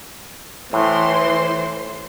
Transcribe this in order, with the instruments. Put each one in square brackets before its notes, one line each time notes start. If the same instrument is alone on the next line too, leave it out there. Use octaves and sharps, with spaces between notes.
[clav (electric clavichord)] A2 [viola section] E3 C5 C6